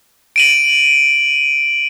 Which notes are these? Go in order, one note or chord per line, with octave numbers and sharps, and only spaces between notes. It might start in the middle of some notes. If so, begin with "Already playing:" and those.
D7 D#7 F#7